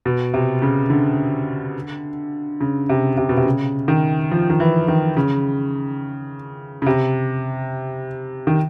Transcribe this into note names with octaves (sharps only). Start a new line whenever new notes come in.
B2
C3
C#3
D3
C#3
C3
C3
B2
C3
C#3
D#3
F3
D#3
E3
D#3
C#3
C#3
C3
D#3